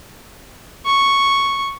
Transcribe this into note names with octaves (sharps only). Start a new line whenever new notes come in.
C#6